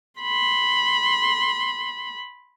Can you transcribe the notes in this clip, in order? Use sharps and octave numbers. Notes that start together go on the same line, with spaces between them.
B5 C6